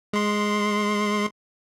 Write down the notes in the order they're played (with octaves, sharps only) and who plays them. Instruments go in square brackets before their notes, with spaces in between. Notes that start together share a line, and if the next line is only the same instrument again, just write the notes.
[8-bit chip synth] G#3 C6